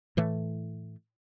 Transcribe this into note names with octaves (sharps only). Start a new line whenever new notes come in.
A2 E3 A3